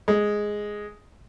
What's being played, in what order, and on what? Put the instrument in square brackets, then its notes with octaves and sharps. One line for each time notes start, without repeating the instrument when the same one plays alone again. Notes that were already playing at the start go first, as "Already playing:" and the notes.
[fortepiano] G#3